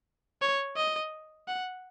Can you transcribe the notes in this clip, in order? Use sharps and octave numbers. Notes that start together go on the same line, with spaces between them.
C#5
D#5
F#5